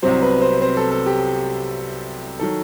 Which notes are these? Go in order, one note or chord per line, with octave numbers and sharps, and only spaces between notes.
C2 C3 F#3 C4 C5
B3 B4
C4 C5
C4 C5
A4
A4
G4
D#3 F#3 A4